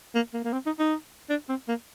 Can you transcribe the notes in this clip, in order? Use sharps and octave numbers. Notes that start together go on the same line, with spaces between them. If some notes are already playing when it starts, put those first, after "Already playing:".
A#3
A#3
A#3
C4
D#4
D#4
D4
C4
A#3